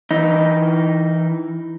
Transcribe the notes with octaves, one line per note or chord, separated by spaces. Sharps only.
E3 D#4